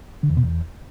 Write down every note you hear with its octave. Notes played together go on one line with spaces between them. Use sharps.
D3
E2
B2
E2